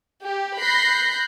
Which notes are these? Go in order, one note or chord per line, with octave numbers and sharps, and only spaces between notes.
G4
B5 F#6 G6 A#6 C7